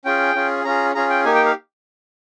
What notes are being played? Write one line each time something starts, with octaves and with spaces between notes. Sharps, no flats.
C#4 F4 G#4 G5
C#4 F4 G#4
C#4 F4 G#4 A#5
C#4 F4 G#4 A#5
G5
A#3 D#4 G4 G#5
G5
F5